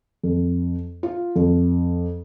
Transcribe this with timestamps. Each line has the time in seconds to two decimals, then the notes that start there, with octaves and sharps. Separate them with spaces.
0.23 F2
1.03 F4
1.36 F2